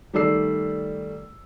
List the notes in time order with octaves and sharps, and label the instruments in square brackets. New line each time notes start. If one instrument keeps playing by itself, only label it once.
[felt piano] D#3 G3 A3 D5 E6 C7